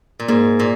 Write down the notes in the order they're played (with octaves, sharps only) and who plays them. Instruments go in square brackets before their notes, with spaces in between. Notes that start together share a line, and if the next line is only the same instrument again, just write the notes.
[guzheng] A#2
[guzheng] G#2 [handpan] A#3
[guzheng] A#2